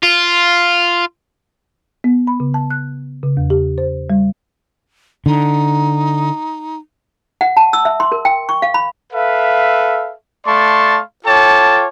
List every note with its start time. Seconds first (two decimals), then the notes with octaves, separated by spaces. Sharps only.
0.03 F4
2.04 B3
2.27 B5
2.40 C#3
2.54 A5
2.70 F#6
3.23 C#3
3.37 E2
3.50 G4
3.78 C5
4.10 G3
5.26 D3 D#4
7.41 F#5
7.57 A5
7.73 E6
7.85 E5
8.00 C6
8.12 A#4
8.25 G5
8.49 C#6
8.62 F5
8.74 B5
9.13 A4 B4 E5 F5
10.46 A3 D5 F5 A5 C6 C#6
11.25 F4 A4 C#5 G5 A5 D6